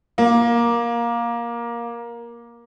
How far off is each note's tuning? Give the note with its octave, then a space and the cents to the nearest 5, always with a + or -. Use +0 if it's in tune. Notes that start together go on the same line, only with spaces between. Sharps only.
A#3 +10